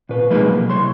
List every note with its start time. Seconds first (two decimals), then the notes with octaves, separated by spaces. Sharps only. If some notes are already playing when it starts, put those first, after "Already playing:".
0.09 A#2 B4
0.31 F3 G#3 A#3 D#4 G#4 B4
0.47 B1
0.70 C2 C#5 C6